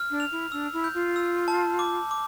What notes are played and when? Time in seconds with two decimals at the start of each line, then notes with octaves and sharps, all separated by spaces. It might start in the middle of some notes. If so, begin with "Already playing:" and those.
Already playing: F6
0.10 D4
0.20 F7
0.32 E4
0.52 D4 E6
0.73 E4
0.84 G6
0.94 F4
1.16 E6
1.48 A5
1.79 D6
2.11 D6